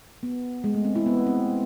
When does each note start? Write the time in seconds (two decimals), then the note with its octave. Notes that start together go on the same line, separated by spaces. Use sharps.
0.23 B3
0.64 G#3
0.74 A3
0.85 C4
0.96 E4
1.06 B3
1.27 C4